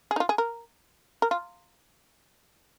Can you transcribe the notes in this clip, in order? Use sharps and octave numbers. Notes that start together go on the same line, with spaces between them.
G#4
D#4
F4
G#4
A#4
A#4
F4